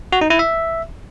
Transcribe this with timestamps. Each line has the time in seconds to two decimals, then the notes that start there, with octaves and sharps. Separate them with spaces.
0.12 F#4
0.21 D#4
0.30 E4
0.39 E5